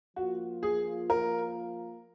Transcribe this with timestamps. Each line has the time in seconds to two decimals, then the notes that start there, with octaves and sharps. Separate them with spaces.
0.16 F3 A#3 F4 F#4
0.63 G#4
1.10 A#4